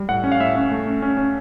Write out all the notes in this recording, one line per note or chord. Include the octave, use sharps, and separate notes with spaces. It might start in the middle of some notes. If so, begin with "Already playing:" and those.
Already playing: G3
A2 F#5
C#4
F5
A2 E5
C#4
A3
C#4
C#4
C#4